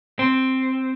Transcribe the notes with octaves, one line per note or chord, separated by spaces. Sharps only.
C4